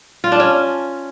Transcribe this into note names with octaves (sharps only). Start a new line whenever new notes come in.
F4
D4
C#4